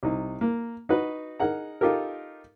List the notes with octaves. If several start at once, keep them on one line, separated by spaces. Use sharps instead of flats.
C2 D#4
A#3
D#4 F#4 B4
D#4 G#4 A#4 F#5 A#5
D#4 F4 G4 A4 A#4